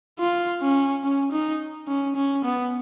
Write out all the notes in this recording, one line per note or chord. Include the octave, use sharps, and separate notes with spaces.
F4
C#4
C#4
D#4
C#4
C#4
B3